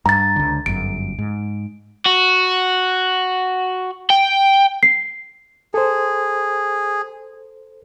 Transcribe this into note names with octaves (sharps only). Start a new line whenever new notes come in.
G2 A#5 A6
C#2 D3
G1 F#2 D7
G#2
F#4
G5
C7
G#4 A4 C5